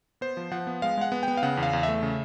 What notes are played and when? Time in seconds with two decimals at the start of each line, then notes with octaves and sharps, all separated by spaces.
0.21 B3 C5
0.37 F3
0.52 F3 F#5
0.67 B3
0.82 G#3 F5
0.98 G#3 F#5
1.12 B3
1.23 G5
1.28 B3
1.37 F5
1.43 C#3 F#5
1.57 E2
1.63 F5
1.73 E2
1.83 E5
1.88 A3
2.03 C#3